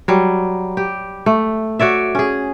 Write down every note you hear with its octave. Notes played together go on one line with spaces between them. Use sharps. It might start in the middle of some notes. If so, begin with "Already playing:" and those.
F#3 G3
G4
A3
F#4 C#5 D5 E5
C#4 G#4